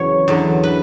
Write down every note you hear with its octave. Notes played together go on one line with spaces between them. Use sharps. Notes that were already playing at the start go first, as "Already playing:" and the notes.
Already playing: E2 C#3 F#3 C#5
E2 D3 F#3
B4